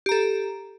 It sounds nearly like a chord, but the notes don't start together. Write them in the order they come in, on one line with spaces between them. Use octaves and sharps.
G4 A#5 A4